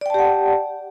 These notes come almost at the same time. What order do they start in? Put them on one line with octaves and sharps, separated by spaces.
D5 G5 A5 G4 F#5